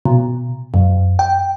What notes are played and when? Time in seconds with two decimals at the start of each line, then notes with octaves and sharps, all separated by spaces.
0.05 B2
0.74 F#2
1.19 G5